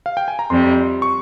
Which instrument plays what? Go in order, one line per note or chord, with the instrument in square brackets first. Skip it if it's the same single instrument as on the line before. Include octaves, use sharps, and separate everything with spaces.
[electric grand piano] F5
G5
G#5
A#5
[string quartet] F2 C3 G3 [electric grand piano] C6
[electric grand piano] C#6